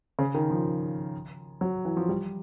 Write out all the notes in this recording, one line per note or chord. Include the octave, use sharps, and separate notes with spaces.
C#3
D#3
F3
F#3
E3
F3
G3